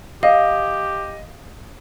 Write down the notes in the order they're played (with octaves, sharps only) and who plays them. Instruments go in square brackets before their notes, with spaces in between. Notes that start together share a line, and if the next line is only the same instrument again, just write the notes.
[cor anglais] G4 [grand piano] D#5 [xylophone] F5